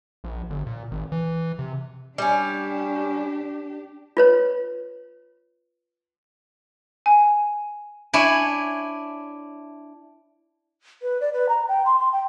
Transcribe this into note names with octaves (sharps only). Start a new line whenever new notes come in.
A#1
G1
A#2
G#1
E3
C3
G3 C#4 D4 G4
F4 B4 C#5
G#5
D4 E4 C#5 G#5
B4
D5
B4
A#5
G5
C6
C6
G5